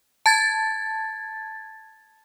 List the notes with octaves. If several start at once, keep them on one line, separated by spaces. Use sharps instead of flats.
A5 G#6 A6